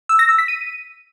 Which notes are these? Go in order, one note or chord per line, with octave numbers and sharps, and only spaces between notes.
E6
A#6
E6
B6
D#7